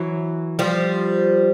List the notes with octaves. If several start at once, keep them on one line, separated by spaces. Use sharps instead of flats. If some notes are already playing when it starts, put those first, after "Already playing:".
Already playing: E3 F#3
F3 G3